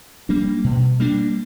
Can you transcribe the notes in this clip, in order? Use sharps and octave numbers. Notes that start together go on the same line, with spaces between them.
G3 A#3 D4
B2
G3 A#3 D4